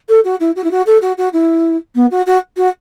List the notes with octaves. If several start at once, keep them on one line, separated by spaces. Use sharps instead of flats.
A4
F#4
E4
F#4
E4
F#4
A4
F#4
F#4
E4
B3
F#4
F#4
F#4